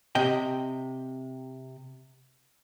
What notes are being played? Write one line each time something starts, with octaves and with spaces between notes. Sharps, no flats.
C3 D#5 G5